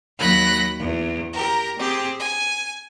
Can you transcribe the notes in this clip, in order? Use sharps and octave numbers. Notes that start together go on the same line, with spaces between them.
D#2 F#3 B5 F#6 A#6
E2
G4 A#4
C4 G4 G#4
G#5